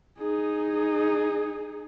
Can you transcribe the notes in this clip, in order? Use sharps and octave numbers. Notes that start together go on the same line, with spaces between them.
D#4 G#4